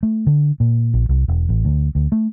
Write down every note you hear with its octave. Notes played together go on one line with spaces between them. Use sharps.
A3
D3
A#2
A#1
C2
E1
A1
D2
D2
A3